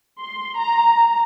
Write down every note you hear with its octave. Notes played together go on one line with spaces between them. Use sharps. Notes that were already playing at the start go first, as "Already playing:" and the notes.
C6
A#5